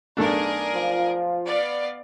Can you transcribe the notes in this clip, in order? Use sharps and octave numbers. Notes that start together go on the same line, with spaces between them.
B1 A3 D4 G#4 A#4 D5
F3 F4
B3 D5 F5